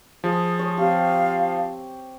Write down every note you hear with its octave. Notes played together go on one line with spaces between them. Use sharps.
F3 G#4
C#5
C4 G4 F5